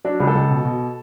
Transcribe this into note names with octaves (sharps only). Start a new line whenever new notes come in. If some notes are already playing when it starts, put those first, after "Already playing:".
F#3 D4
C#2
A4
C#2
B2
B2